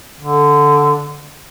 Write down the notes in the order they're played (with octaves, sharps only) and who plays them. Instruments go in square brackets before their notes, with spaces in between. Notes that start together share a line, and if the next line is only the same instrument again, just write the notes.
[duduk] D3